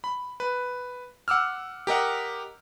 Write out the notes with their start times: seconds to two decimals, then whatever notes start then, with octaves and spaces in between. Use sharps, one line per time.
0.04 B5
0.40 B4
1.28 F#5 D6 E6 F6
1.87 G4 A#4 D#5 F#5